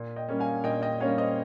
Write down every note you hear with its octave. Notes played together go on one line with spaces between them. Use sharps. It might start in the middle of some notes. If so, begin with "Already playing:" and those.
Already playing: A#2
D#5 G5
G3 A#3 C#4
F5 G#5
A#2 D#5 G5
D#5 G5
G3 A#3 C#4 C#5 F5
C5 D#5